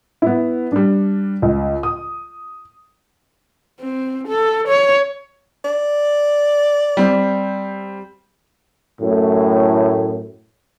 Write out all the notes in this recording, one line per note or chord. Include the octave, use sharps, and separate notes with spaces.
B3 E4
G3 D4
C#2
D#6
C4
A4
C#5
D5
G3 C4
F#2 A2